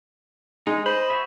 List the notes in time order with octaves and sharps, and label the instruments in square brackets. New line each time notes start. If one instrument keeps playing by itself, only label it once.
[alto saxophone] G#3 [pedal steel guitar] D#4
[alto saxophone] C5 [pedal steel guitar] D#5 B5
[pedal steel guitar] F#4 G#4 E5